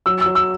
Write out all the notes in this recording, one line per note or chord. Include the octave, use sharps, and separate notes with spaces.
F#3 E6
F#3 E6
E6